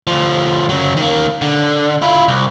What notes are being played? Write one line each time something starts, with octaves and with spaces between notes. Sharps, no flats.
D2 F3
C#3 F#3
D#3 A#3
D3
E4 F4
C2